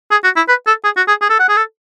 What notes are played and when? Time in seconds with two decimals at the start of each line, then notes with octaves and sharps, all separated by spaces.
0.11 G#4
0.24 F#4
0.36 E4
0.48 B4
0.67 A4
0.84 G#4
0.97 F#4
1.08 G#4
1.21 G#4
1.30 A4
1.40 F#5
1.49 G#4
1.57 A4